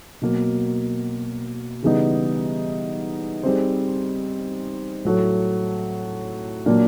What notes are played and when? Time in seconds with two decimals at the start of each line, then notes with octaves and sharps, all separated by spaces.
0.22 B2 F#3 A#3
1.82 C#3 E3 G3 B3 D#4
3.43 G3 C4 D#4 G#4 C5
5.05 A2 F#3 A3
6.66 A#2 F#3 A#3 D4